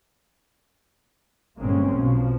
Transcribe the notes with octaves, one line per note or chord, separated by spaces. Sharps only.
G1 A#2 G#3 A#3 C4 C#4
B1 B2 F3